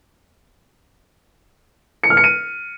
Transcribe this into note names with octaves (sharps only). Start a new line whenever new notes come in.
C#7
F6
C#7
D#7